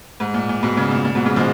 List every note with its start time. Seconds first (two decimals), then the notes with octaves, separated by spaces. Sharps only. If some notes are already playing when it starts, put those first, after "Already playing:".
0.20 G#2
0.34 A#2
0.49 A#2
0.63 G#2 B2
0.77 A#2 C#3
0.91 A#2
1.05 A#2
1.15 G#2 B2
1.25 A#2 C#3
1.36 F3 G#3